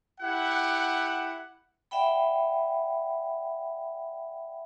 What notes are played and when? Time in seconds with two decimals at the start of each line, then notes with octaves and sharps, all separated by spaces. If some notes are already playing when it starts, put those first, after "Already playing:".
0.21 E4 G4 F#5
1.91 D5 E5 F#5 G5 B5